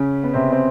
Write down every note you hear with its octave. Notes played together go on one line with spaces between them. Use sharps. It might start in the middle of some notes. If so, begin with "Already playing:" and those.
Already playing: C#3 C#4
B3
C3 C4
C4